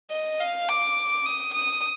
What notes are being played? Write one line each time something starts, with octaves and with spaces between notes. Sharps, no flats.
D#5
F5
D6
D#6
D#6